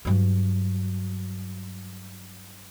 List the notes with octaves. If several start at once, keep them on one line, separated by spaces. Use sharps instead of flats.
G2 F#3